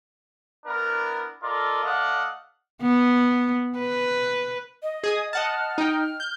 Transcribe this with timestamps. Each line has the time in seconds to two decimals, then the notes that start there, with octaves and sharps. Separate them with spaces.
0.66 B3 D4 E4 A#4
1.43 F4 A4 A#4 D5 D#5
1.84 A3 D5 D#5 F5 F#5
2.82 B3
3.78 B4
4.83 D#5
5.04 G#4 G#5 D#6
5.33 D#5 F#5 A5 F6
5.78 D#4 G5
6.20 G6